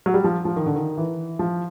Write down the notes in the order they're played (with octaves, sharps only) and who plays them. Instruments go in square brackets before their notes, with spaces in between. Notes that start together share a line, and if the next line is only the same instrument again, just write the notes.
[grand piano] F#3
G3
F3
F3
D#3
D3
D#3
E3
F3